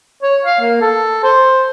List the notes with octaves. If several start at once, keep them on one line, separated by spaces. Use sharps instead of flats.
C#5
F5
A#3
A4
C5